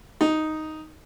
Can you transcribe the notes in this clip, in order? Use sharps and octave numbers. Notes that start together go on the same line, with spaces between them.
D#4